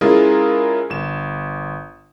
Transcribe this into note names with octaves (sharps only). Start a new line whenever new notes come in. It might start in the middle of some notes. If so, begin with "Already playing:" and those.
G#3 C#4 E4 F4 G#4 A#4
G1 E7